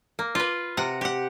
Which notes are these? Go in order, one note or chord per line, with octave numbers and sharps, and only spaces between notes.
A#3
F4 B4
C3 F#5 A#5
G4 F#5